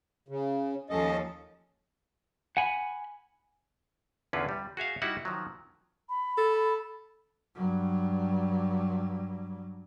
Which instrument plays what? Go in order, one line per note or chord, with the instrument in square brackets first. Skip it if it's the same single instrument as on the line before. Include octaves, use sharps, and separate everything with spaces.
[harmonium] C#3
[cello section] D#2 F3 A4 [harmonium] C#4 D#5
[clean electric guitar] F#5 G#5 B5
[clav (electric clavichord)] E2 D3 C#4 E4 F4 B4
G3
F#4 G#4 E5 F5
G3 D#4 E4 F#4 F#5
D#3 F3 F#3
[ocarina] B5
[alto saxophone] A4
[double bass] G2 F#3